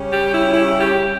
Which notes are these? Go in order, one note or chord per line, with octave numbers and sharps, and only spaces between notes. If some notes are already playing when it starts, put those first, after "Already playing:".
Already playing: C#3 G3 C#4
G4
E4
E4
G4